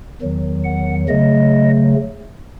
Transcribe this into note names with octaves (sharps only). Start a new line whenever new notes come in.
E2 D#3 F#3
F#5
C#3 F#3 A3 D#5